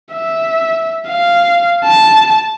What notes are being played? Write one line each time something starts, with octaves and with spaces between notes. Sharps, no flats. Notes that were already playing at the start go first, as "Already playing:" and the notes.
E5
F5
A5